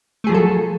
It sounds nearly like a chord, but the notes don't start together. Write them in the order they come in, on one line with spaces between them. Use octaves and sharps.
A3 G#4 F3 F#3 A4